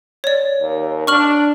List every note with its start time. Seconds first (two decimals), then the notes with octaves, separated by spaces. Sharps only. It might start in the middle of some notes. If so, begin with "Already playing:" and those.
0.24 C#5 D5
0.61 D#2
1.07 D4 C#6 F6 F#7